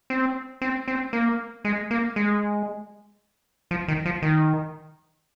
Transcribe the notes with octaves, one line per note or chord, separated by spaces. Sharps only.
C4
C4
C4
A#3
G#3
A#3
G#3
F3
D#3
F3
D#3